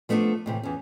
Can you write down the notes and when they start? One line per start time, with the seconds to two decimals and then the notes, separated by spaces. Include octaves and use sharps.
0.09 F3 A3 B3 C4 D4
0.46 A2 C3 E3
0.63 E2 C#4